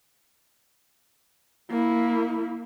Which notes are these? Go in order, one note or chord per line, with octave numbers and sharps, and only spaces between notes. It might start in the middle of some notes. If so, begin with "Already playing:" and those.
A#3 E4